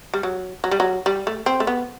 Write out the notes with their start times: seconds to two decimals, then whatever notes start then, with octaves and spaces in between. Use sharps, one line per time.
0.14 G3
0.23 F#3
0.64 F#3
0.71 G3
0.80 F#3
1.06 G3
1.27 A3
1.46 C4
1.60 A3
1.67 B3